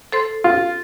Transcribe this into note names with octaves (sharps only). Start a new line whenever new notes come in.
A4 C5 C6
F4